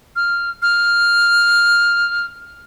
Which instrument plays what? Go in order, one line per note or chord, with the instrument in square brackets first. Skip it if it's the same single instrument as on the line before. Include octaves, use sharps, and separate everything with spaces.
[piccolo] F6
F6